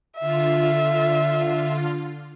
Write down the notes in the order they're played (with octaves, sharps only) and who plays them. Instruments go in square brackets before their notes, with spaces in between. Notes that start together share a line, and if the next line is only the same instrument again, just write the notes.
[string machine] D3 F4 [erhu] E5